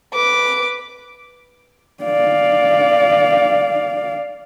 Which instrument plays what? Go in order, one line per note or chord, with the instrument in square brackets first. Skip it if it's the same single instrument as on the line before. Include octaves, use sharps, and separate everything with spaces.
[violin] B4 D6
[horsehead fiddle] D5 F5